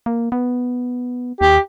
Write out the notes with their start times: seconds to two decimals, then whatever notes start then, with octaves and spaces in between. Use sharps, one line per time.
0.06 A#3
0.32 B3
1.41 D#2 G4